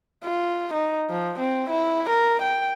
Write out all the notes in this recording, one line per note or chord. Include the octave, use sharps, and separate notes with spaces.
F4
D#4
F3
C4
E4
A#4
G5